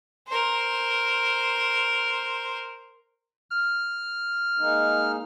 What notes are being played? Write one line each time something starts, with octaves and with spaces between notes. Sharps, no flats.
A#4 C5
F6
G#3 A#3 D#4